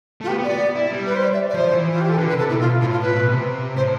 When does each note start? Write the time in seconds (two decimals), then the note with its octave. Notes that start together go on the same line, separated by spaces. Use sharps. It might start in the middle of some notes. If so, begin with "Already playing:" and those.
0.21 A3
0.24 F4
0.28 B3 G4
0.39 B3
0.44 D5
0.49 B3
0.75 E4
0.91 G3
1.06 B4
1.15 C5
1.23 D5
1.33 E5
1.50 D5
1.54 F3 C5
1.71 E3
1.92 F4
2.01 G4
2.09 A4
2.18 D3 B4
2.29 B4
2.33 C3
2.39 A4
2.49 B2 E4
2.59 B2 F4
2.81 A2 F4
2.92 F4
3.02 B4
3.13 B2
3.29 C3
3.76 A2 C5